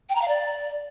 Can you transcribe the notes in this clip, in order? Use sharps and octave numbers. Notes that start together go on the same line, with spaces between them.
G5
A#5
F5
D5